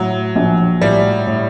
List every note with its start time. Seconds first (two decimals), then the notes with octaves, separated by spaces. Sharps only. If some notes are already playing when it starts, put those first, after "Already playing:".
Already playing: A2 F#3
0.35 A#1
0.81 A2 G3
1.27 A2